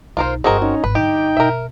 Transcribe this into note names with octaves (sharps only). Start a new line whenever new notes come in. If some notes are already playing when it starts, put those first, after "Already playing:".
B1 D#4 F4 A#4 C5
G1 G3 C4 F#4 G#4 A#4 D#5
C#4 D#4
G#1 B4
G2 D3 D#4 G4 G5
B2 A#4 E5